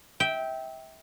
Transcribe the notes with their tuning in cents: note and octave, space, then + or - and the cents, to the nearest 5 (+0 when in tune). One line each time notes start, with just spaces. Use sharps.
E5 -25 G5 -5